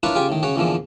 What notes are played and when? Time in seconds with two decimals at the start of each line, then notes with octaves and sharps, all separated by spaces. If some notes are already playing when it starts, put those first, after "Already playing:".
0.03 D4 E4 F4 A#4 B4 C#5
0.15 C#3 F4 G4 G#5 C#6
0.29 A2 D#3
0.43 C#3 F#4 C#5
0.56 E2 A#2 D3 E3 F3